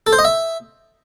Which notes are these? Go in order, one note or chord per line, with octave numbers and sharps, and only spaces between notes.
A4
C5
D#5
E5